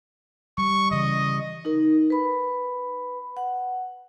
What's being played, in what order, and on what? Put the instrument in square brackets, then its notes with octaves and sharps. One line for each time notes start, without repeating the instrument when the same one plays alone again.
[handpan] G3 [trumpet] C#6
[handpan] C#3 E3 [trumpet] D#5
[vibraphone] D#4 A#4
B4 B5
F#5